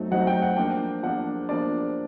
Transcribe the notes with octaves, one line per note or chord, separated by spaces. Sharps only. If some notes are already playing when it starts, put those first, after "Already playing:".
Already playing: F#3 A3 C4 D#4
F#3 A3 C4 D#4 F#5
G5
F#5
F3 A#3 D4 G5
F3 A#3 D4 F#5
F3 A#3 D4 D5